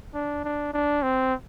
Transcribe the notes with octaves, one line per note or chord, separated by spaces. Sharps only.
D4
D4
D4
C4